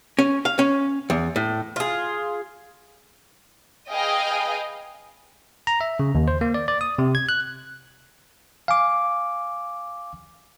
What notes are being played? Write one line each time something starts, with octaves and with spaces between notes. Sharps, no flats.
C#4
F5
C#4
E2
A2
F4 G#4
G#4 B4 D#5 F5 G5 G#5
A#5
E5
C#3
D#2
C5
A#3
D5
D5
D#6
C3
G#6
F#6
F5 G#5 D6